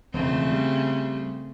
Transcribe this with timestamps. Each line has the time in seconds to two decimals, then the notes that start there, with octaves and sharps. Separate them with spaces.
0.14 E1 F2 C#3 A3 C4
0.52 G3